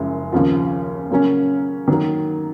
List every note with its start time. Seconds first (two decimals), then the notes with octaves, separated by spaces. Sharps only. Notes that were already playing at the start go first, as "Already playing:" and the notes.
Already playing: F#1 F#2 F3 G#3
0.32 D#2 C#3 F3
1.10 C#3 F#3 A#3 C#4
1.88 D#3 F#3 A#3